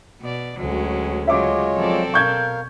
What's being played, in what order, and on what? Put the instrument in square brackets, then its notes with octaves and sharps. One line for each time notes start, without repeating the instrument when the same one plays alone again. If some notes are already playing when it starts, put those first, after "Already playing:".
[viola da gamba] B2 D5
[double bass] D2 [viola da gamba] F#3 G#3 C#4
[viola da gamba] C#3 F#3 [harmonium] G#3 F4 C#5 [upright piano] E5 D6
[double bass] F3 F#3 [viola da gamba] C4 A4 D5
[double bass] B2 [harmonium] A#4 F5 [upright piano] C#6 G6 G#6